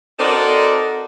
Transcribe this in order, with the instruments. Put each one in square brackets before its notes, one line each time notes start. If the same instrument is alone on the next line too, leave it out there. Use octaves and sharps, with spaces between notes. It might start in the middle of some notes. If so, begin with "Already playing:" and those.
[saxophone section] C4 D#4 F#4 A4 A#4 D5